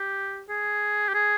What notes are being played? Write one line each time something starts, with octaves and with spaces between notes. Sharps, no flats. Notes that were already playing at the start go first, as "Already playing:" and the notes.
Already playing: G4
G#4
G4
G#4